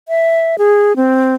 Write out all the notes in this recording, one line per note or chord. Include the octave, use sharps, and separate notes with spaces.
E5
G#4
C4